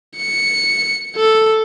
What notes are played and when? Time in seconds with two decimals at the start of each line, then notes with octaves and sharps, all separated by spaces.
0.17 C#7
1.16 A4